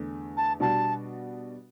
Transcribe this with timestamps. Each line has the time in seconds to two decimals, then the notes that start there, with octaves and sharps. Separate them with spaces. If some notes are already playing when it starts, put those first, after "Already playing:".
Already playing: E2 D3 A3
0.36 A5
0.60 B2 G3 D4 F#4 A5